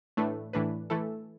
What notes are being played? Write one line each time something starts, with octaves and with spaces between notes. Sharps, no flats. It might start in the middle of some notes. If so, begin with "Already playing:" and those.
A2 E3 A3 D4 B4
A2 E3 A3 D4 B4
E3 A3 E4 A4